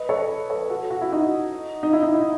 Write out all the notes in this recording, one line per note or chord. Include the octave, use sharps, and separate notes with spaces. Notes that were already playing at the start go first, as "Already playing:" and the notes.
Already playing: B4 D#5
A4 C#5
A4 C#5
F#4 A4
F#4
E4
D#4 F#4
D#4
E4
D#4
E4